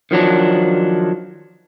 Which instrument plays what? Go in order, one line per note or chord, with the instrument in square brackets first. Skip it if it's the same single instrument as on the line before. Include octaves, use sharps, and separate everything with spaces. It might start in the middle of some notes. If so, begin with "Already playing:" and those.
[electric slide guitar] D#3 F3 F#3 D4